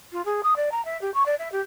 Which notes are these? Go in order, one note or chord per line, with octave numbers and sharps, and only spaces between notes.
F4
G#4
D#6
D5
A#5
E5
G4
C#6
D5
E5
G4